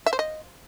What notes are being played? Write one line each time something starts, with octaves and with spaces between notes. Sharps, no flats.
E5
C5
D#5